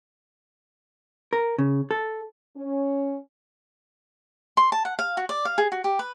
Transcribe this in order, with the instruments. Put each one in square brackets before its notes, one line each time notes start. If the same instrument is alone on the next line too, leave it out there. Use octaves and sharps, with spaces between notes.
[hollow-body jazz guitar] A#4
C#3
A4
[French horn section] C#4
[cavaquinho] C6
A5
F#5
F5
F#4
D5
F5
G#4
F#4
G4
B4